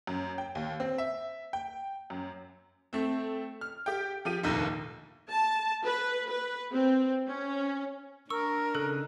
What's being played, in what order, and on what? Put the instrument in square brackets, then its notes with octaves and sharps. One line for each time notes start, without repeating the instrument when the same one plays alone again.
[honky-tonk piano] F#2
G5
D#2
C4
E5
G5
F#2
A3 C4
F6
G4 G5
F3 G4 D#7
F1 A#1 D#2 D#3
[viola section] A5
B4
B4
C4
C#4
[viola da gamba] D4 [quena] A#4 [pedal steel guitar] C#6 [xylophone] E6
[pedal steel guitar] C#3 D#4 F#6 [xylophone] A4